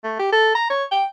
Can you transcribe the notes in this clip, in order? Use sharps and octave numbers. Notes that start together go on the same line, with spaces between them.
A3
G4
A4
A#5
C#5
G5